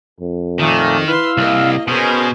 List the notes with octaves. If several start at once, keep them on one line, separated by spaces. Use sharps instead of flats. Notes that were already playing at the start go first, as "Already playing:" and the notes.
F2
A#2 D#3 A3
E4 B4 F5 C6 E6
C2 A#3 D#5
B2 C#4 G#4 A#4 C5